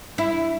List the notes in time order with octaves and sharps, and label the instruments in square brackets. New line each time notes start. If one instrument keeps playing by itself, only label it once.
[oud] E4